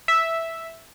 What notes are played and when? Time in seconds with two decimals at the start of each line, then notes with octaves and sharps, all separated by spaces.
0.08 E5